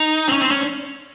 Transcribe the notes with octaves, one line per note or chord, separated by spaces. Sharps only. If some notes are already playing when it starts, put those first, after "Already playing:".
Already playing: D#4
C4
C#4
C4
C#4